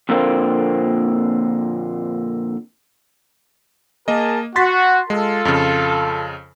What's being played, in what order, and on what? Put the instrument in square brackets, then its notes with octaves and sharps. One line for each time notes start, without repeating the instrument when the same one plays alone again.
[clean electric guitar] F2 A#2 D3 A#3 C4
[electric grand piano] A#3 D#5 [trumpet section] G#4 A#4 A5
[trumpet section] F#4 [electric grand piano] C6 A6 B6
[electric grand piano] G#3 [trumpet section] F4 A4
[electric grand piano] F2 C#3